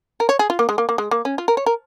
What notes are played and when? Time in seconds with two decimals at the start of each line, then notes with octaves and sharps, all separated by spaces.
0.20 A#4
0.29 C#5
0.39 G#4
0.50 F4
0.59 A#3
0.69 G#3
0.78 A#3
0.89 A#3
0.98 G#3
1.11 A#3
1.25 C#4
1.38 F4
1.48 A#4
1.57 C#5
1.66 A#4